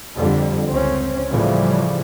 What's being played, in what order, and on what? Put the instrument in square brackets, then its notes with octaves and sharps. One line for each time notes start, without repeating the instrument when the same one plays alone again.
[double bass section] F2 D3 G3
C#2 C4 C#4
A2 C#3 E3 F3 G3